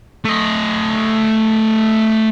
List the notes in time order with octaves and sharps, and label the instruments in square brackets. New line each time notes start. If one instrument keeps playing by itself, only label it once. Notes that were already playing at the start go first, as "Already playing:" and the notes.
[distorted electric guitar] A3 D#5